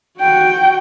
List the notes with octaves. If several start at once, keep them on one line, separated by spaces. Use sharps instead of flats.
F#4 G5